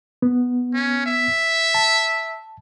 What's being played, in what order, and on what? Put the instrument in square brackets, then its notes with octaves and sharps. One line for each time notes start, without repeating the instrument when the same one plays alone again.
[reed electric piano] B3
[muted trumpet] C#4
E5
[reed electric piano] A5